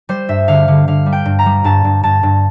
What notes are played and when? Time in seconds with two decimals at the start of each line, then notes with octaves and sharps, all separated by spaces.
0.09 G3 C5
0.29 G2 E5
0.48 D3 F5
0.68 D3
0.88 D3 F5
1.06 G3
1.12 G5
1.25 G2
1.39 A#5
1.46 G3
1.64 G2 A5
1.85 G2
2.03 G2 A5
2.23 G2